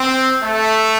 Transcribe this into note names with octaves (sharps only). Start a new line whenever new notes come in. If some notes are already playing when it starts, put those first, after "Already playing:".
Already playing: C4
A3